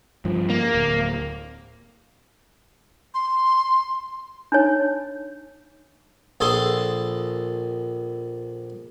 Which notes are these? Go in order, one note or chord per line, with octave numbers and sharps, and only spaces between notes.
G2 F3
A#3
D1
C6
D4 D#4 C#5
A#1 G#4 A4 A5 C6